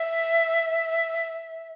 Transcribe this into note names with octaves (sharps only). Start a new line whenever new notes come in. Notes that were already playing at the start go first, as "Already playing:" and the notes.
Already playing: E5